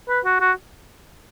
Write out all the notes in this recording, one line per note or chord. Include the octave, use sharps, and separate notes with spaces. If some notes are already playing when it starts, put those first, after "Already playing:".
B4
F#4
F#4